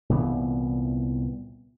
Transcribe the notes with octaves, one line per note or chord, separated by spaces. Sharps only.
C2 A#2 E3 B3